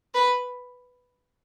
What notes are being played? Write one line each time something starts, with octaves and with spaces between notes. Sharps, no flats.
B4